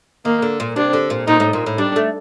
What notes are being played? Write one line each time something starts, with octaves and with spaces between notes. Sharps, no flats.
D#3 A#3
D3
A#2
C3 D4
D3
A#2
A#2 D#4
A2
A#2
A2
G3 D4
A3